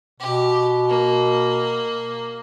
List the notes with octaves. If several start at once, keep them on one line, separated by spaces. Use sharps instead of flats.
B2 G4
A#3